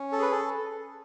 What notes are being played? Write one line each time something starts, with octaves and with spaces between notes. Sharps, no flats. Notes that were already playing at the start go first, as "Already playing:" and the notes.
Already playing: C#4
A4
G#4 B4
A4